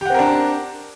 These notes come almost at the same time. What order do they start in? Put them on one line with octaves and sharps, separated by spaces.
G4 F#5 C4 A#4 D4